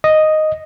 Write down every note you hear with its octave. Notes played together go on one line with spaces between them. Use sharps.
D#5